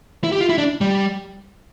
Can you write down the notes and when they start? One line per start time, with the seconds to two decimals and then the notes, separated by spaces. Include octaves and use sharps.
0.24 E4
0.32 G4
0.41 F4
0.49 E4
0.58 D4
0.81 G3